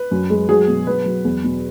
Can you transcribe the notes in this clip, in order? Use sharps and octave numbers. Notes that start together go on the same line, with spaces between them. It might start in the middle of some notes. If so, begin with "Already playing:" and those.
Already playing: B4
F#2
G#3
F#3 G#4
B2
F#3 B4
F#3
E2
B2